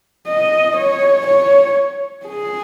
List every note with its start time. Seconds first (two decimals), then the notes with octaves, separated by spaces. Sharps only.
0.28 D#5
0.78 C#5
1.27 C#5
2.26 G#4